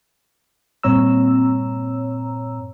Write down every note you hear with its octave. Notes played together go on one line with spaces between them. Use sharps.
G2 A#2 C4 C#5 A#5 E6